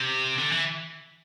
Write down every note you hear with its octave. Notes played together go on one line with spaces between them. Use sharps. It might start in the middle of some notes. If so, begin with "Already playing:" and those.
Already playing: C3
D3
E3